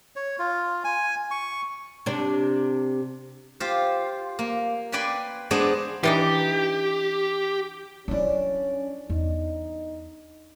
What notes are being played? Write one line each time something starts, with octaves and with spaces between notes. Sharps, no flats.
C#5
F4
G#5
C#6
C3 D4
F4 G4 C5
A#3
B4 D5 G5 G#5 B5 C6
G#3 B3 D4 G#4 C5 D5
E3 D4 D#4 G4
F#3 C#4 D4 E4
E2 D#4